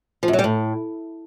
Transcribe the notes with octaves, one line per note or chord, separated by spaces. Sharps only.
F3
F#2
F#3
G3
A2